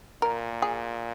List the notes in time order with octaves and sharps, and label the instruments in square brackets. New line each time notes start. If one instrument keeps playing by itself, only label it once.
[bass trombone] A#2 [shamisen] A#4
[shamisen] G#4